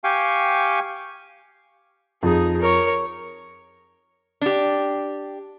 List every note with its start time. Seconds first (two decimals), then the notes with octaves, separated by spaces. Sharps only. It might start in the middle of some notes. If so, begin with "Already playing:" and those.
0.04 G4 F5 G5 G#5 C#6
2.23 F2 D#4 G#4
2.61 A#4 C#5
4.41 D4 G4